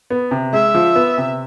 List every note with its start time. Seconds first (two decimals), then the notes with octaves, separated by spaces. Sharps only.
0.10 B3
0.31 C3
0.53 G#3 E5
0.74 F3
0.96 B3
1.18 C3